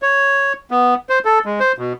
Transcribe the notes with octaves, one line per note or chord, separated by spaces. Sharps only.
C#5
B3
C5
A4
G#3
C5
B2